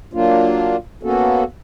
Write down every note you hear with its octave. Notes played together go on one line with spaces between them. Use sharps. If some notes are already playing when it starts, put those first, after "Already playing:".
F#3 A#3 D4 F4
A#3 B3 C#4 F#4 A4